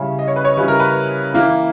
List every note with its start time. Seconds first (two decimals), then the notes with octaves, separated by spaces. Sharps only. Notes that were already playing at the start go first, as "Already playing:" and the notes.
Already playing: C#3 G3 C#4 E4
0.19 D#5
0.28 C#5
0.36 B4
0.45 C#5
0.57 C#3 G3 C#4 E4 B4
0.68 A#4
0.80 B4
1.34 E3 A#3 E4